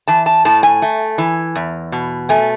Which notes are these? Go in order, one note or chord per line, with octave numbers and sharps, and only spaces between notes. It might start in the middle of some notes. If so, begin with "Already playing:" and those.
E3 A5
A5
A2 A5
G#5
A3
E3
E2
B2
A3 G#5